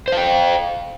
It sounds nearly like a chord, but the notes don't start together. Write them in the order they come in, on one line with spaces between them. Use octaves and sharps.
C5 F5 G5